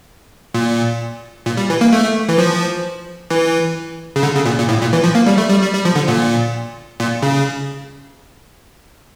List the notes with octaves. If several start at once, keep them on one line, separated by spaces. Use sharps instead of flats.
A#2
A#2
G3
E3
A#3
A3
E3
F3
E3
C#3
D3
C#3
A#2
A#2
A2
A#2
E3
F3
A#3
G3
A3
G3
G3
G3
F3
D3
A#2
A#2
C#3